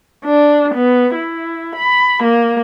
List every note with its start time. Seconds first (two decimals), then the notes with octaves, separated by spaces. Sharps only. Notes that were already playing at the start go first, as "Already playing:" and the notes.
0.24 D4
0.75 B3
1.14 E4
1.76 B5
2.23 A#3